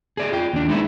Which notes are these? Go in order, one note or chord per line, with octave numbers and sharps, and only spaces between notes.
G#4 D5 D#5
F4 G5
D#2 D4
G#3 B3 D#4 E4